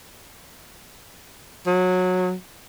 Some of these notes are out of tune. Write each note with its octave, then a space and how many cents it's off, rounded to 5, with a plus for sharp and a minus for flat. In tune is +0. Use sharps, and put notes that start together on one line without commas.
F#3 -20